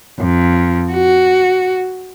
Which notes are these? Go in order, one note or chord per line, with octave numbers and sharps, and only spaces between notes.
F2
F#4